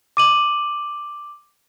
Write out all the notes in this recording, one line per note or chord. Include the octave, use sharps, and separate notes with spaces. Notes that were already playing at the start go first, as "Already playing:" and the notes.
D6 D#7 F#7